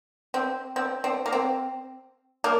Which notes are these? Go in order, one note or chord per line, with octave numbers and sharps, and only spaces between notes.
C4
C4
C4
A#3
C4
A#3